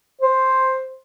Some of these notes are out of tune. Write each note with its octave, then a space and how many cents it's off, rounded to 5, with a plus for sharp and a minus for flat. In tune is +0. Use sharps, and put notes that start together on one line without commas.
C5 +5